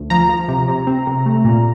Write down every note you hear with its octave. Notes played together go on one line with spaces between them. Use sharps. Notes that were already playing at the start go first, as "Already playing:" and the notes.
Already playing: D2
F3 A#5
F3
C3
C3
C4
C3
A3
A#2